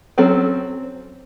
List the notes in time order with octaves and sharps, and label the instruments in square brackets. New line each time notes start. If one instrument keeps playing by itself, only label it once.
[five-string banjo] F#3 C4 C#4 A4